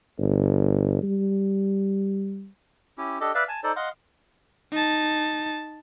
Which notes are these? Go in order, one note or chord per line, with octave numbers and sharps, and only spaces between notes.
G1
G3
C#4 E4 G4
D4 G4 A4 D#5
B4 D5 E5 F5
G#5 A5
D#4 A4 C5 D5
D#5 F5 F#5 C6
D#4 A5